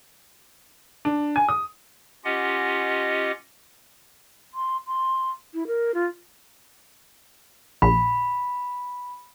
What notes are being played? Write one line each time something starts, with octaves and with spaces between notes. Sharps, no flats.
D4
G#5
D#6
C#4 F4 G4 D#5 F#5
C6
C6
E4
A#4
F4
A#1 B5